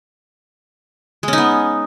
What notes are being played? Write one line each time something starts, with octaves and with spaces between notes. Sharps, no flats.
G#3 B3 C#4 D#4